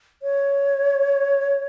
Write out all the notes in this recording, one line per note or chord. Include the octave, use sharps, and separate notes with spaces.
C#5